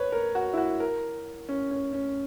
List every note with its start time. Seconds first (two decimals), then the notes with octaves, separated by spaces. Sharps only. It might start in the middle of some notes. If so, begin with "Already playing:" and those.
Already playing: B4 C#5
0.12 A#4
0.35 F#4
0.53 E4
0.58 F#4
0.80 A#4
1.49 C#4
1.71 C#4
1.93 C#4